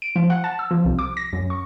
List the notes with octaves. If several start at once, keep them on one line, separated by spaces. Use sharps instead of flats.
D7
F3
F#5
A5
E6
F3
C2
D6
A#6
F#2
C#6